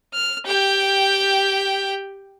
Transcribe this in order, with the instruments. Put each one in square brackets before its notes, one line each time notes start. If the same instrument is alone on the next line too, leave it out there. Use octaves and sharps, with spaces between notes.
[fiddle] F6
G4 G5